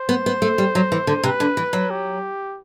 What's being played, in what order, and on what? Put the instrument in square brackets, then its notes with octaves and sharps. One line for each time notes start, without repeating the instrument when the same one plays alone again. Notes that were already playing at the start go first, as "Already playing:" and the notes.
Already playing: [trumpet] C5
[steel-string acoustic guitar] B3
B3
A3
G3
F#3
E3
D3
[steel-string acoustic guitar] C3 [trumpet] B4
[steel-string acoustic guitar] D3
E3
F#3
[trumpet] G4